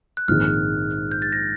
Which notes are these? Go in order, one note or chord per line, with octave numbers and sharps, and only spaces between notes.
F#6
A#1 G#2 D#3 G#3 C4 F6
G6
A6
A#6